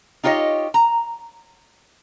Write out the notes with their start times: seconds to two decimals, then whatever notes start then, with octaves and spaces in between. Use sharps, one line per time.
0.24 D#4 F4 G4 C#5 D#5
0.74 A#5